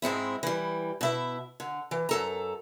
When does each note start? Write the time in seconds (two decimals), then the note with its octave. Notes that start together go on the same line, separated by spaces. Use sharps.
0.02 G#2 G#3 C4 E4
0.43 E3 G3
1.01 B2 E4 E5
1.60 D3
1.91 E3
2.09 F#2 A4 A#5